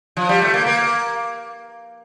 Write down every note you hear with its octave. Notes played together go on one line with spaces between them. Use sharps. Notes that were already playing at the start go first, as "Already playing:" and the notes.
F3
G3
A3
A#3
A#3